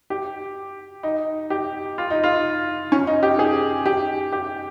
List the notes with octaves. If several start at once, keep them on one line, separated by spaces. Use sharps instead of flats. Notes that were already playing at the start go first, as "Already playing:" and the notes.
G4
D#4
G4
F4
D#4
F4
C#4
D#4
G4
G#4
G4
G4